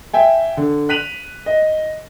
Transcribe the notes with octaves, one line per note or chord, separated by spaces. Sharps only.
E5 G5 G#5
D3
F#6 B6 D#7 F7 F#7
D#5